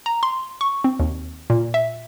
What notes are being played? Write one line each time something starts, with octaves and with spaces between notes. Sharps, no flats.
A#5
C6
C#6
C4
D#2
A#2
E5